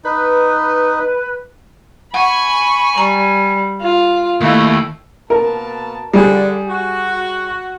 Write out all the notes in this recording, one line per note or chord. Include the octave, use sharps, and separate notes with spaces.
D#4 B4
F#5 G#5 B5 C#6
G3 A#5
F4
D#2 A3 E4 D#5 F5
B2 A#3 A#4 A5
D3 G3 G#4 D5
F#4